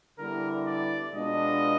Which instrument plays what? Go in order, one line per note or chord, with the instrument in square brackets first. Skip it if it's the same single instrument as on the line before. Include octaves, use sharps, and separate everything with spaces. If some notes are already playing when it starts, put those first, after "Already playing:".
[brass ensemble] D3 G3 B3 E4 [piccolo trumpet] A#4
[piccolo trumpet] D5
[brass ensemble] B2 G#3 B3 D4 F4 [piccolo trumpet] D#5